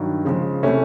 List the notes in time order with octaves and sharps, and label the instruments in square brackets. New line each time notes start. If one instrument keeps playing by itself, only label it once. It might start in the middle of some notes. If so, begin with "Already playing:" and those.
Already playing: [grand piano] G2 D#3 F#3
C#3 F3 G#3
C3 E3 A3 C#4